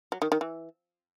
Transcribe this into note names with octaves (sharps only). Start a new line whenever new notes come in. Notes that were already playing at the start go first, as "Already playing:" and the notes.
F#3
D#3
D#3
E3